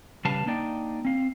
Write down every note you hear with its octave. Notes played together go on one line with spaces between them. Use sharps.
C#3 G3 B4 F5 A5
A#3 D4 D#4 D5 G5
C4 F5